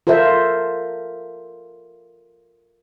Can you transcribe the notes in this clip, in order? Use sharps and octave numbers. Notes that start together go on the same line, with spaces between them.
F4 A4 A#4 C5 E5